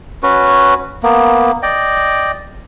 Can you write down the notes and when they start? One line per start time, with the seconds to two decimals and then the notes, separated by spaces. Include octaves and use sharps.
0.23 C#4 F#4 B4
1.03 A#3 B3
1.63 D5 D#5 G5